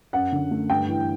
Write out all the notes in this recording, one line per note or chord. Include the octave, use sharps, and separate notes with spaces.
F#2 F#5
D3
A3
G2 G5
E3